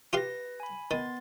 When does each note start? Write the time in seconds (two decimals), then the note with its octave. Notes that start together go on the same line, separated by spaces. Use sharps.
0.13 F4 G4 B4 F5 A#6
0.60 G#5 B5
0.91 D#3 B3 C6 A6